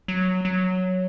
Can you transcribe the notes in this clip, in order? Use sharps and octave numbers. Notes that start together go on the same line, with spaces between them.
F#3
F#3